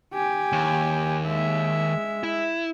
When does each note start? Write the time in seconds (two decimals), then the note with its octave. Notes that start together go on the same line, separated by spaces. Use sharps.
0.14 G4 G#5
0.52 D#2
1.25 G#3 E5
2.23 E4